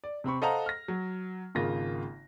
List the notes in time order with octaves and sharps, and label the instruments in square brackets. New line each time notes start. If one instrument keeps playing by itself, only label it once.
[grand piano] D5
C3 C4 B5 C#6
A4 C5 D#5 F5 F#5 A#5
F6 A#6
F#3
G#1 C#3 A#3 F4 A#6